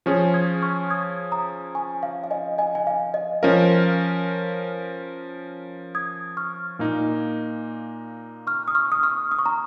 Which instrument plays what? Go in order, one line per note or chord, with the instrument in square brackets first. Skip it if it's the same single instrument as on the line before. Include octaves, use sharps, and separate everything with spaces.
[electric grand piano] F3 C#4 G#4 [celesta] C#6 F6
[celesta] D#6 G#6
C#6 F6
D#6 G#6
A#5 D#6
G#5 C#6
F5
F5
D#5 G#5
D#5 G#5
G#5
F5
D#5
[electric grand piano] F3 C#4 A#4 [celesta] F5
[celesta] D#6 G#6
C#6 F6
[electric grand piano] A#2 A#3 D#4
[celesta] C#6 F6
D#6
C#6 F6
D#6
C#6 F6
D#6
C#6
A#5